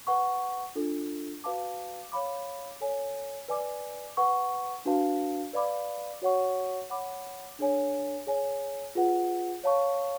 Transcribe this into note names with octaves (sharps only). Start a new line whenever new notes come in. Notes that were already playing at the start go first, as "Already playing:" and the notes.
B4 F#5 C#6
D4 F4 A4
F#4 B4 F5 A5 D6
C#5 F5 B5 D6
A4 C#5 G#5
B4 D5 G#5 D6
B4 F#5 C#6
D4 F#4 B4 F5 A5
B4 D5 F5 B5 D6
F#4 C#5 F#5 C#6
C#5 F#5 B5 D6
D4 G#4 C#5 G#5
G#4 C#5 G#5
F4 G#4 B4 F#5
C#5 F5 A5 C#6